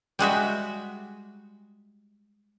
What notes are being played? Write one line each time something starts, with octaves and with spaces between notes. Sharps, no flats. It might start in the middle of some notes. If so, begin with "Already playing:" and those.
G3 G#3 F#4 E5